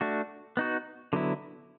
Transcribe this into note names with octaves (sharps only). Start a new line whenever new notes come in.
A3 D4 F#4
B3 D#4 F#4
D3 F#3 B3 E4